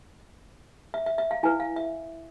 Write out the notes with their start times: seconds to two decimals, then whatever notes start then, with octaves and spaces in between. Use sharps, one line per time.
0.94 E5
1.06 E5
1.18 E5
1.31 F5
1.43 E4 B4 G#5
1.60 F5
1.76 E5